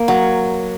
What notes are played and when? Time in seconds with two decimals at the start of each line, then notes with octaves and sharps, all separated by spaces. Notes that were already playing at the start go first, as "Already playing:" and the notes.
Already playing: A#3
0.08 F#3